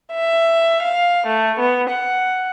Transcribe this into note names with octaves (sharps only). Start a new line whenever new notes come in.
E5
F5
A3
B3
F#5